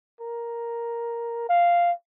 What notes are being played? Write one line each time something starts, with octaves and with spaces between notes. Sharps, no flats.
A#4
F5